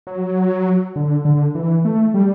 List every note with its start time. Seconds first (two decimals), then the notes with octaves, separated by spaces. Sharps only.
0.07 F#3
0.96 D3
1.25 D3
1.55 E3
1.85 A3
2.14 G3